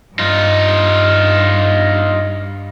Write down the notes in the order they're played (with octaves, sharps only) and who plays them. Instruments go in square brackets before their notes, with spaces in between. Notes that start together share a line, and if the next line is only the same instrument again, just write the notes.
[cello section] G2 [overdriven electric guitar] D#4 F4